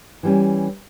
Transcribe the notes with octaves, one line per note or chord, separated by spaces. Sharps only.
E3 G3 C#4